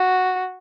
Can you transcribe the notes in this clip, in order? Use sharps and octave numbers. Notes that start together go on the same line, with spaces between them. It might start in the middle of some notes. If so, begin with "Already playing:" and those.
Already playing: F#4